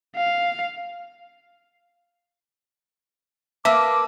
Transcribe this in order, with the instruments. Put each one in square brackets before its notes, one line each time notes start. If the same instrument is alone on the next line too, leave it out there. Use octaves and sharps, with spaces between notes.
[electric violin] F5
[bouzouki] A#3 B4 [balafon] E5 [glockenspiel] A5 E6 [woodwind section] D6